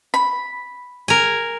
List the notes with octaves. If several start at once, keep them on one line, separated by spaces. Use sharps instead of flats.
B5
A#4 G#5